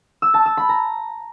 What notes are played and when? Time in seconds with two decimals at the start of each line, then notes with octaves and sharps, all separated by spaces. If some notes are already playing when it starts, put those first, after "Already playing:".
0.22 E6
0.34 A5
0.46 E6
0.57 B5
0.69 A#5